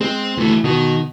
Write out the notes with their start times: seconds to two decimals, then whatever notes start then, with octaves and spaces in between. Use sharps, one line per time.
0.01 G#3 C4
0.37 D#2 E3 A3
0.64 B2 D#3